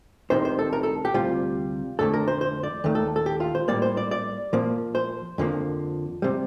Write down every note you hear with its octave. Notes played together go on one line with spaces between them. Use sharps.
C2 C3 D#3 C5
C5
A4
A#4
A4
G4
D2 C3 G3 F4
F2 D3 A3 A4
A#4
C5
C5
D5
D#2 D#3 A3
A4
A4
G4
F4
C5
A2 G3 A#3 D5
C5
D5
D5
A#2 F3 A#3
C5
F2 D3 F3 A#3
C3 G3